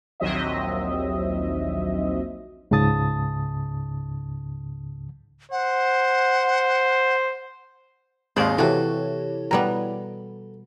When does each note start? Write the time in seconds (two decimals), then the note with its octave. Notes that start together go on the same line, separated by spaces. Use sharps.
0.20 A#1 D#2 F#3 C4 D#5 E5
2.71 C#2 G#2 C#3 A5 D#6 A6
5.52 C5 F#5
8.36 G#1 D#2 G#3 C5 D5 D#5 F5
8.58 C3 E3 E4 F#4 G4 A4 C#5
9.51 B2 G3 B3 A#5